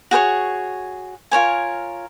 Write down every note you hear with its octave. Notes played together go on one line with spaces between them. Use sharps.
F#4 G#4 B4 C#5
F4 A#4 C#5 G#5